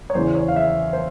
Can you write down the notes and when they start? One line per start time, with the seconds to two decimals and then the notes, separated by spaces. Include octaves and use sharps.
0.10 C#5
0.15 E2 C#3 E3 C5
0.35 C#5
0.48 F5
0.56 E5
0.93 C5